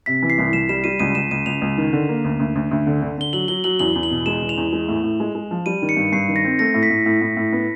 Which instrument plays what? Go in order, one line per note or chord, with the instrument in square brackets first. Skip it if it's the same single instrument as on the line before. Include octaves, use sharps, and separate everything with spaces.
[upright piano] C3 [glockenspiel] B6
[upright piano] E3
[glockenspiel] C7
[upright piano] C2
[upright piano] C2 [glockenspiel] E7
[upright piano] G3 [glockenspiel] E7
[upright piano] G3 [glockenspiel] D#7
[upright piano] C#2 [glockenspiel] D#7
[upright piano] C#2 [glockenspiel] E7
[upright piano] C#2 [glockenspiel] D#7
[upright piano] C#2 [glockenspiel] F7
[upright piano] C#2
D#3
D3
A#3
D2
D2
D2
D2
D3
D3
[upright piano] D3 [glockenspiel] G7
[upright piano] F#3 [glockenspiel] F#7
[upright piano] F#3 [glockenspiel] G7
[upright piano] F#3 [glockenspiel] F#7
[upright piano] E2 [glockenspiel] F#7
[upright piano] E2
[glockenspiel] F#7
[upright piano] B2
[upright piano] G#3 [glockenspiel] E7
[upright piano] E2
[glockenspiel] F7
[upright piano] E2
G#3
A2
A2
G#3
G#3
F3
[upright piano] G3 [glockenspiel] D#7
[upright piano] D#3
[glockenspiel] C#7
[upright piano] G2
[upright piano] G2 [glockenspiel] C7
[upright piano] D#3
[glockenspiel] A#6
[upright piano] C4
[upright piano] A3 [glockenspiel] A#6
[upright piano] A2
[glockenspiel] B6
[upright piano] A2
A2
A2
A2
B3